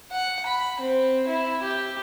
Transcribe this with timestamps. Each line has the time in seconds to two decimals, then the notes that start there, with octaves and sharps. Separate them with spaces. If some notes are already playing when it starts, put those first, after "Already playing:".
0.11 F#5
0.46 B5
0.80 C4
1.27 E4
1.62 G4